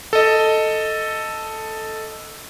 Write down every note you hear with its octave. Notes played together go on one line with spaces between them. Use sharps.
A4 D#5